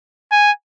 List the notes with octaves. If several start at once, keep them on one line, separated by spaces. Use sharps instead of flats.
G#5